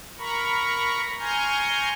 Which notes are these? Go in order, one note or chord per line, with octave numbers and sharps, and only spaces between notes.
A#4 A#5 B5 C#6
G#5 A#5 C6 C#6 F6 G6